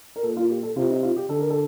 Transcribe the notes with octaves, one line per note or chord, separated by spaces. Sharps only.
A#4
A#2 A4
F4
G4
A4
C3 F4
D#4
F4
G4
D3 A4
A#4
A4